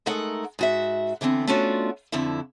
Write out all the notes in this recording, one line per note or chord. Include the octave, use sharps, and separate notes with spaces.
G#3 A3 D#4 A4 A#4 F#5
G#2 F#4 E5
D3 E3 B3 C4
A3 B3 C#4 D4 F4 F#4
F2 D3 F3 E4